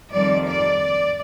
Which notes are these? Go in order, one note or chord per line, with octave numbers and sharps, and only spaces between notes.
F2 D#3 G3 D5
D5